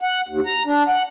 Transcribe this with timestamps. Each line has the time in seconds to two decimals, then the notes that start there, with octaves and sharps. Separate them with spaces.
0.01 F#5
0.28 D#2
0.46 A#5
0.66 D4
0.88 F#5